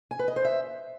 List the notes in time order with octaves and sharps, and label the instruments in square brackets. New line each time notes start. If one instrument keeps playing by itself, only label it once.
[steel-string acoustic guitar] G#5
B4
D#5
C5
E5